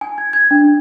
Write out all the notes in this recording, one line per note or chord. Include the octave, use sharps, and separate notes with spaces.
G#5
G#6
G#6
D4